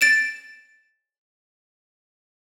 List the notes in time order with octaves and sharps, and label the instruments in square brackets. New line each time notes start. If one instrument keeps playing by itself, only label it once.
[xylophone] A6 D7 E7